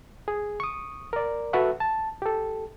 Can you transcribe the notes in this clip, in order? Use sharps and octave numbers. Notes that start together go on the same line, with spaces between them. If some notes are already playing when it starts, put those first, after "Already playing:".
G#4
C#6 D#6
A#4 D5
F#4 A4 B4 E5 F#5 C#6
A5
G4 A4